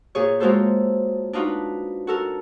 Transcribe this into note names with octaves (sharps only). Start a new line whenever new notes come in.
A#2 G#4 C#5
G#3 A#3 F4 F#4 A4 C5
D4 D#4 F4 F#4 B4
F#4 A4 A#4